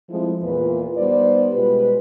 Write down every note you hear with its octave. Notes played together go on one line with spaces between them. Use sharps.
F3 G#3 A3 C4 E4
E2 A#2 F4 B4
G3 B3 D#4 C5 D5
B2 G#3 F4 G4 B4